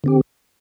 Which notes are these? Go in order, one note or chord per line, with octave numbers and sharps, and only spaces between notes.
D3 C4 G4